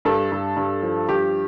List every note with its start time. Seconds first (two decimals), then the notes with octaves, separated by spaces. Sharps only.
0.05 G2 A4
0.32 G2
0.57 G2
0.83 F3
1.08 G2 G4